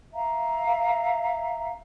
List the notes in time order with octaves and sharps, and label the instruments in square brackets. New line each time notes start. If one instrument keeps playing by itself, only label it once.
[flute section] E5 F5 A#5